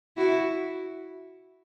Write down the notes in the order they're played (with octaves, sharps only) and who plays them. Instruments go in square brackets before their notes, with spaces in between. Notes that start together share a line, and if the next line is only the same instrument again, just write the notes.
[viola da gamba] E4 F#4